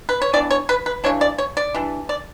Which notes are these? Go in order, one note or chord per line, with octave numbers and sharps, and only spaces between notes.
B4
C#5
E3 B3 D4 D5
C#5
B4
B4
C#3 E3 G3 D4 C#5
D5
C#5
D5
E3 G3 D4
D5